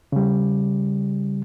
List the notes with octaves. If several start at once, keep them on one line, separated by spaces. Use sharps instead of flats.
C#3 G3